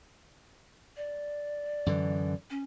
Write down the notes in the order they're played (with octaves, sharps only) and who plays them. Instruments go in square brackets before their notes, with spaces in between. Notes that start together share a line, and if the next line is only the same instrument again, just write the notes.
[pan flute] D5
[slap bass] F#2 D3 E3
[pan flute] C#4